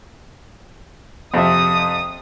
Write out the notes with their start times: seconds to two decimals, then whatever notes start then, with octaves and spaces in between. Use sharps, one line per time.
1.34 F2 C3 E5 D#6